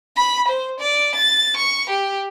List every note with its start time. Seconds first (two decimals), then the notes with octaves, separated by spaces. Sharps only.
0.17 B5
0.48 C5
0.80 D5
1.15 A6
1.57 C#6
1.90 G4